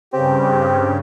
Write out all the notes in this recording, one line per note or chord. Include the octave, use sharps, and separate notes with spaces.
G2 C#3 C4 G4